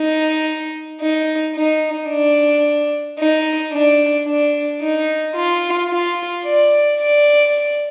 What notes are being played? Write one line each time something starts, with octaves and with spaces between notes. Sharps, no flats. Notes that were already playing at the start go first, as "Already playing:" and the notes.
Already playing: D#4
D#4
D#4
D4
D#4
D4
D4
D#4
F4
F4
D5
D5